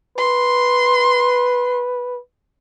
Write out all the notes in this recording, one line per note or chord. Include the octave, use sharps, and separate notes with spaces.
B4 C6